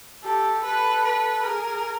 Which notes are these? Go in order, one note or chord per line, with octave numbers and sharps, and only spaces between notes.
G4 A4
A4 B4
B4
G#4 A#4